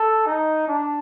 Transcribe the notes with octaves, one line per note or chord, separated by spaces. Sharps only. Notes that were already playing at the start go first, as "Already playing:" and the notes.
Already playing: A4
D#4
D4